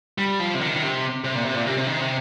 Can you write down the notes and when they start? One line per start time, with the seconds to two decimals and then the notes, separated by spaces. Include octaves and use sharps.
0.18 G3
0.40 F3
0.54 C3
0.61 D#3
0.76 D#3
0.82 C3
1.24 C3
1.35 A#2
1.45 C3
1.55 A#2
1.66 C3
1.77 C3
1.87 D#3
2.01 C3